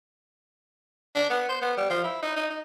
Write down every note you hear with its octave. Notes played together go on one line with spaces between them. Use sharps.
D4
B3
C5
B3
G3
F3
E4
D#4
D#4
D#4